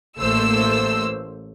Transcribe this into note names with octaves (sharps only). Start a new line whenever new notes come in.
A1 A3 A#3 C5 E6